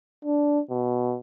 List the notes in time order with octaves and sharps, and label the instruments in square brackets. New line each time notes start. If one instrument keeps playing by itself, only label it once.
[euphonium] D4
B2